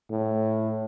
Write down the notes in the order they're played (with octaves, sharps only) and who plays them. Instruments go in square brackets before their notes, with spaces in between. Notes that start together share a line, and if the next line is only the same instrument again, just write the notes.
[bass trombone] A2